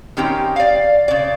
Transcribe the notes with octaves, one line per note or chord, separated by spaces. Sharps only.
D#3 C4 C#4 G4 G5
D5 F5
C#3 D5